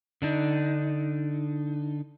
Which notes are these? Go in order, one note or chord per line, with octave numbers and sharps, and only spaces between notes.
D3 D4 D#4